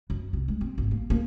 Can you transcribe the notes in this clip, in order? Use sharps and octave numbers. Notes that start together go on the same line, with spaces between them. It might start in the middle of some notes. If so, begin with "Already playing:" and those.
F#2
C2
G#3
C4
G#1
A#3
A#3